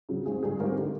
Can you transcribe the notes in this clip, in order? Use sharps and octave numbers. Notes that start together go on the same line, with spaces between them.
C#3 F#3
G#1 G#4
G2 D3 G3 G#4
G#1 A#4
D3 G3